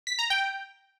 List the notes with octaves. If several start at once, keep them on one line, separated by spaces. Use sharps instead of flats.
B6
A#5
G5